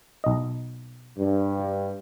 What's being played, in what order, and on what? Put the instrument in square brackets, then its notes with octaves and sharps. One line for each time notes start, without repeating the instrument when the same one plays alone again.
[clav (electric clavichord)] B1 D#5
[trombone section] G2